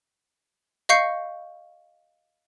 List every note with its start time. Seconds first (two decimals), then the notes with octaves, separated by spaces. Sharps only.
0.89 D#5 F5 C#6 G6 C7 C#7